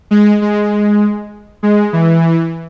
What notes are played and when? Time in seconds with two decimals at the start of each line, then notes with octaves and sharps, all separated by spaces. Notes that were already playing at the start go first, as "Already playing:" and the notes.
0.11 G#3
0.42 G#3
1.63 G#3
1.93 E3